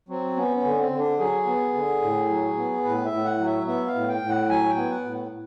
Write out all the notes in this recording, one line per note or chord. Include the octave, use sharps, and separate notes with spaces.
F#3 C4
B3 C#4
C#4
D3
C4
D3
D4
F#3 G#4
B3
D3
A2
F#3
B3
A2 B4
E5
A2
F#5
F#3
E5
B3 E5
F5
A2
G5
A2
F#5
F#3 G#5
G5
B3
F#5
A2